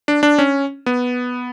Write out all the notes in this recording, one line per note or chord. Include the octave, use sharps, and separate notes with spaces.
D4
D4
C#4
B3